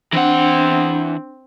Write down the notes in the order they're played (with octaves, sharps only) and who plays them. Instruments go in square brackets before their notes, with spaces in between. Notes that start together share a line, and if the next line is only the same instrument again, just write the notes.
[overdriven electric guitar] E3 F#5 [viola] C4 [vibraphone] D4